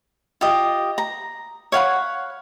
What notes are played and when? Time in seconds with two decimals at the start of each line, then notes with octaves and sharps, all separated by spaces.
0.41 F4 G4 D#5
0.98 A#5
1.72 C#5 F5 F#5 B5